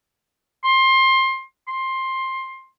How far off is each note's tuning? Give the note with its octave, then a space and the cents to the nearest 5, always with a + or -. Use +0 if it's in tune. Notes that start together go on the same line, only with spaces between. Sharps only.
C6 +20
C6 +15